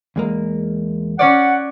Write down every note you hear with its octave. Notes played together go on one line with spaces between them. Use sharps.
E2 G#3 A#3
C#4 C#5 D5 F#5